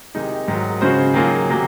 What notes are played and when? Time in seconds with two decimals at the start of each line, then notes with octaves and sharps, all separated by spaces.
0.15 C3 D#3 G#3 D#4
0.48 G#2 D#3 F#3
0.81 C#3 G#3 C#4 F#4 C5
1.14 D#3 F#3 A#3 F4 G#4
1.49 C3 F#3 A#3